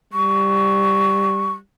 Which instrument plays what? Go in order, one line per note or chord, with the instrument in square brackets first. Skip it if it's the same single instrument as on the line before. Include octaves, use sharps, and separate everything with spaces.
[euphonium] G3 [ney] C#6